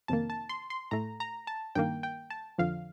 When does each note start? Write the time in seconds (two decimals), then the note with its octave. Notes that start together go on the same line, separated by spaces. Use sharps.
0.08 F2 C3 D#3 A#3 A5
0.30 A5
0.49 C6
0.70 C6
0.91 A2 A3 A#5
1.20 A#5
1.47 A5
1.75 G2 D#3 A#3 G5
2.03 G5
2.30 A5
2.58 F2 D3 F3 F5